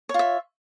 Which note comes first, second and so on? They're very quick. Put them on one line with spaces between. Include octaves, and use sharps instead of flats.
C#5 F4 E5